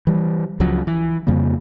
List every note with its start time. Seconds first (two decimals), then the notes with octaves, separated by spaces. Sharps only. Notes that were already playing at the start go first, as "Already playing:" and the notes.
0.07 E3 G3
0.60 C#2 C#3 F3 F#3
0.87 E3
1.27 F2 C#3 G3 A#3